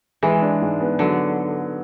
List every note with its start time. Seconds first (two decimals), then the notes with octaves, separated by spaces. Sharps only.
0.23 E3 G#3
0.42 D4
0.62 G#2
0.80 B3
0.99 D3 F#3